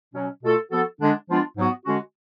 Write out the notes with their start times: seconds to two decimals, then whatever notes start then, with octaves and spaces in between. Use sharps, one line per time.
0.14 B2 F#3 C#4
0.43 B2 A3 F4 A4
0.71 F3 B3 F#4 A4
1.00 D3 G#3 D4
1.29 F3 G#3 B3 D4 F4
1.57 G#2 F#3 B3 F#4
1.86 D3 G#3 C#4 F#4